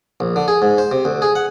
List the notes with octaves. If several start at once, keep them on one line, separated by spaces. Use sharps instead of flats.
A#1
D3
G#4
G#2
C5
C3
D2
G#4
F#5